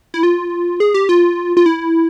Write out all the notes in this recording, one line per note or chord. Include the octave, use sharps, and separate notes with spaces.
E4
F4
G#4
G4
F4
F4
E4